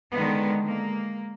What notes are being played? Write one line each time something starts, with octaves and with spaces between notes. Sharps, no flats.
D3 D#3 G#3 B3
G#3 A#3